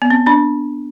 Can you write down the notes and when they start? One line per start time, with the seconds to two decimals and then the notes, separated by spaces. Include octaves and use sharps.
0.02 B3
0.10 C4
0.26 C4 D4